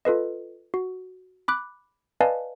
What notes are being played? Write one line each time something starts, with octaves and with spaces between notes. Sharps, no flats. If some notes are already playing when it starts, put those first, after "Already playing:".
F4 A4 B4 D#5
F#4
B5 D6 F#6
B4 D5 D#5 F5 G#5 A5